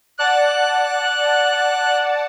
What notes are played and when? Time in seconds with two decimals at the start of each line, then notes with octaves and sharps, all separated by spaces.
0.19 D5 F#5 A5 F#6